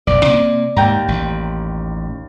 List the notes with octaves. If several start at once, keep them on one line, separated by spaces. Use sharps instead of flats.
F1 B1 D5
C3 A#3
D#2 G#2 G5 A#5
A1